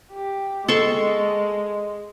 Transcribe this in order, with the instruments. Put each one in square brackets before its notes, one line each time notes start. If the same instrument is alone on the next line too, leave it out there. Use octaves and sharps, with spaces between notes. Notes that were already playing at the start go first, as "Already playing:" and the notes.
[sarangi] G4
[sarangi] G#3 [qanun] A4 C6 C#6